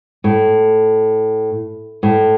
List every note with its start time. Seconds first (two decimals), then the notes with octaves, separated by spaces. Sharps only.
0.24 A2
2.03 A2